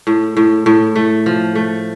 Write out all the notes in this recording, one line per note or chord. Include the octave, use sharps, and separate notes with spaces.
A2
A2
A2
A3
F3
A3